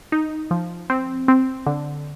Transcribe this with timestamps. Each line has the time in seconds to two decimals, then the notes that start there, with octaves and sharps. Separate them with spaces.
0.12 D#4
0.51 F3
0.90 C4
1.28 C4
1.66 D3